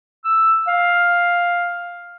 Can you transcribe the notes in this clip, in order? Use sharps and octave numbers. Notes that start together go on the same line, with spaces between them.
E6
F5